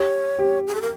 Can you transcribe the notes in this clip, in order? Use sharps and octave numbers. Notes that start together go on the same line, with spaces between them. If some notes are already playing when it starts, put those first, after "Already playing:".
Already playing: G4 C#5
G4
G#4
A4
A#4